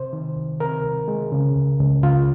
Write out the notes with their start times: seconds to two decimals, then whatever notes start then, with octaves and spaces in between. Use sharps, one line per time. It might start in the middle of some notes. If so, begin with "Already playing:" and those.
Already playing: C3 C5
0.13 D#3
0.36 C2
0.60 C3 A#4
0.84 C2
1.08 G#3
1.32 C#3
1.56 C#2
1.79 C#2
2.03 C#2 F4